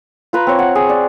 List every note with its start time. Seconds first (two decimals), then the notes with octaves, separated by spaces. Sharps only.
0.33 F4 B4 A#5
0.47 C4 C#5
0.59 F#5
0.75 G#4
0.89 D5